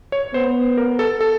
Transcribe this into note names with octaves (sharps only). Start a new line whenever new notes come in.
C#5
B3 C5
A#4
A4
A4